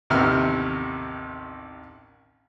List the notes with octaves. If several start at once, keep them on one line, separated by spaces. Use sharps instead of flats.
A1 D#2 C3 B3 E6 F6